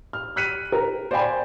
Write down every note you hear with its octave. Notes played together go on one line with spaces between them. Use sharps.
F6
F6 F#6 B6 C#7 D#7
A#4
C5 D5 F5 G5 G#5 B5